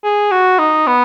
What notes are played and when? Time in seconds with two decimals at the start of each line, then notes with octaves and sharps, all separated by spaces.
0.04 G#4
0.31 F#4
0.59 D#4
0.87 B3